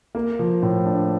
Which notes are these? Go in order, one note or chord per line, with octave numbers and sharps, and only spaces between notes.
A#3
F3
A2
D4